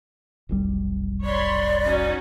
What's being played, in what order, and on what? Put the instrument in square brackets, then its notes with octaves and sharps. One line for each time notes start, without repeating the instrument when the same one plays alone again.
[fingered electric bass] F1 B1 G3
[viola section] C#5 B5 C6 [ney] D5
[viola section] C#4 D#4 F#4